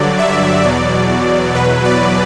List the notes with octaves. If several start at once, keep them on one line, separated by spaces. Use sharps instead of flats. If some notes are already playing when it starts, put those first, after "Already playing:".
Already playing: G2 D3 F#3 D5
E5
E2 B2 F#3 D5
E2 B2 F#3 B4
D5